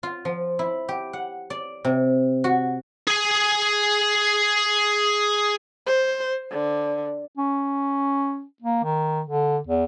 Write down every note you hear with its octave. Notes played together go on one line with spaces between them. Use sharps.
F4
F3
E4
G4
F#5
D5
C3
F#4
G#4 G#5
C5
D3
C#4
A#3
D#3
D3
E2